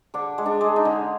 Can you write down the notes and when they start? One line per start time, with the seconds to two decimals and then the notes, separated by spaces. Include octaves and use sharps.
0.14 D3 D4
0.38 G#3
0.46 D4
0.61 G#3
0.76 D#4
0.85 D3